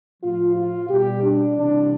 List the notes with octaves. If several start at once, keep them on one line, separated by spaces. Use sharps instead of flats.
A2 F3 F4
F4
B2 G3 G4
D4
C3 E3 G3 D4